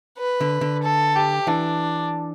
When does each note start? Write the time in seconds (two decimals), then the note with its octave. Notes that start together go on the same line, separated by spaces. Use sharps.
0.19 B4
0.41 D3
0.61 D3
0.84 A4
1.16 G4
1.47 E3 D4